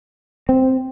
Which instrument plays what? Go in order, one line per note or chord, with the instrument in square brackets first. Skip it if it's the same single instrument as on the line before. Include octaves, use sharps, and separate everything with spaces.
[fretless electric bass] C4